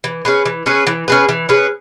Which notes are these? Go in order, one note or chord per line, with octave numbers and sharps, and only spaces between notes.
E3
C#4 G#4 B4
E3
C#4 G#4 B4
E3
C#4 G#4 B4
E3
C#4 G#4 B4